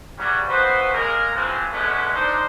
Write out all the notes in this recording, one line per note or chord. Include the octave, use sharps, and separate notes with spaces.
C#3 E3 F#3 G3
D#2 B3 F#4 B4 C5
G#3 A#3 G#4 A#4
C#3 E3 F3 G#3 C4
B2 D3 G#3 A3 C#4 B4
D4 D#4 C5